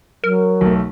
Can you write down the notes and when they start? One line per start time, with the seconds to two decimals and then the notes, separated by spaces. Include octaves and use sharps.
0.24 F#3 A#4
0.61 B1 A3